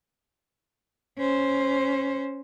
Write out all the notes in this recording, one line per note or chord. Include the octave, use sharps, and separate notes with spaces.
C#4 C5